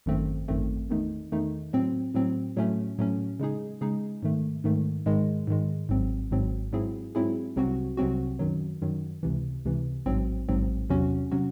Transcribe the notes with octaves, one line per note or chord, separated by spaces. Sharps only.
G#1 F#2 D#3 A3 C4
G#1 F#2 D#3 A3 C4
E2 D#3 A3 D#4
E2 D#3 A3 D#4
A2 F#3 C4
A2 F#3 C4
A2 F#3 A3 C#4
A2 F#3 A3 C#4
C#3 G#3 D#4 G#4
C#3 G#3 D#4 G#4
G#2 D#3 A3
G#2 D#3 A3
G#2 D#3 G#3
G#2 D#3 G#3
G#1 G#2 F#3 C4
G#1 G#2 F#3 C4
G#2 F#3 C4 E4 G#4
G#2 F#3 C4 E4 G#4
C2 C3 F#3 C4 F#4
C2 C3 F#3 C4 F#4
F#2 D#3 F#3
F#2 D#3 F#3
C#2 C3 E3
C#2 C3 E3
A1 G#2 F#3 C4
A1 G#2 F#3 C4
E2 C3 F#3 C#4 F#4
C3 F#3 C#4 F#4